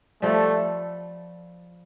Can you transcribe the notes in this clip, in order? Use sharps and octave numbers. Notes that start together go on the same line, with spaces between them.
F3 G3 A3